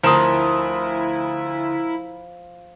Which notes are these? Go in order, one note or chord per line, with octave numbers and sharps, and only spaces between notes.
D2 F3 E4 F4 A#4 D#6 E7